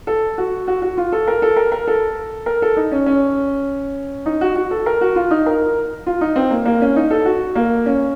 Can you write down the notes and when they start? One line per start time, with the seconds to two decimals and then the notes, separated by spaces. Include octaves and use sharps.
0.07 A4
0.38 F#4
0.68 F#4
0.82 F#4
0.97 F4
1.12 A4
1.28 A#4
1.42 A4
1.56 A#4
1.72 A#4
1.87 A4
2.46 A#4
2.62 A4
2.77 D#4
2.92 C#4
3.06 C#4
4.26 D#4
4.41 F#4
4.56 F#4
4.71 A4
4.86 A#4
5.01 F#4
5.16 F4
5.31 D#4
5.46 A#4
6.07 F4
6.21 D#4
6.36 C4
6.51 A#3
6.66 A#3
6.81 C#4
6.96 D#4
7.10 A4
7.25 F#4
7.55 A#3
7.86 C#4